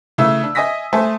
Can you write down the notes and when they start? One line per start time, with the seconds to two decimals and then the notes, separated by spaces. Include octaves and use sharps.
0.18 C#3 E3 A3 E5 E6
0.43 D4
0.55 D#5 E5 G#5 D#6 A#6 B6
0.93 A3 C5 E5 G#5 A5